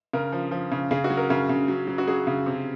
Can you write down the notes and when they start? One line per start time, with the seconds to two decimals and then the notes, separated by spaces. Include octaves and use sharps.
0.13 C#3 A#4
0.32 F3
0.51 F3
0.72 C#3
0.91 C#3 G#4
1.04 F#4
1.10 F#3
1.17 A#4
1.29 C#3 G#4
1.49 C#3
1.68 F#3
1.88 F#3
1.98 F#4
2.08 F#3 G#4
2.27 C#3
2.46 C3